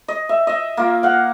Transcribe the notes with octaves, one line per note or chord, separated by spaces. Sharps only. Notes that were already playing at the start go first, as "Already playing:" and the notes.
D#5
E5
D#5 E5
A#3 F4
F5 F#5